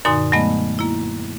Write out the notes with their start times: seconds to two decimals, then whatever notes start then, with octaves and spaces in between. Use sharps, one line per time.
0.05 F#2 A#2 D3 D#4 G#5 C6
0.32 F#3 G#3 A3 B3 D#5
0.79 A#3 E4